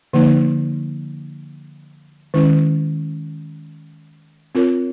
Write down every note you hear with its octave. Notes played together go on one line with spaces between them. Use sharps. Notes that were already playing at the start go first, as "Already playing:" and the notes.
D3 F3 A#3 D#4
D#3 G#3 C#4 E4
C4 F4 A#4 C#5